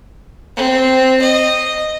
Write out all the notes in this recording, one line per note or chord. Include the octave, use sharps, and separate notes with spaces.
C4
D#5